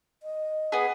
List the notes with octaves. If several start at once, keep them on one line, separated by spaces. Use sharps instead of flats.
D#5
B3 G#4